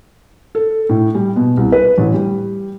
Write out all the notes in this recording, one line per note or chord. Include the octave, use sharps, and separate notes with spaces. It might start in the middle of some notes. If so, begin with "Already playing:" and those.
A4
A2
G3
B2
C2
B4
A1
G3